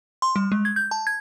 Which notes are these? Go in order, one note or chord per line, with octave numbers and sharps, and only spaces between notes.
C6
G3
G#3
G#6
G6
A5
G#6